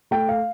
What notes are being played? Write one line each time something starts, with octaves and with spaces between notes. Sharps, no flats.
A3 G5
F5